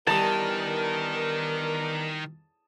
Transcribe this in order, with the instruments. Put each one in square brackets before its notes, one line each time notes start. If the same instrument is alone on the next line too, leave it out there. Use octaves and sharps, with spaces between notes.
[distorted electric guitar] D#3 [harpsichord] E3 G3 [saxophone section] B3 D4 A#4 [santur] A5 D#6